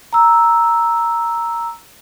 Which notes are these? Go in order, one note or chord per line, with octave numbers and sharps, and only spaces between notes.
A#5 E6